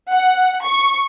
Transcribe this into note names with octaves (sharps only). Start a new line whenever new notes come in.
F#5
C#6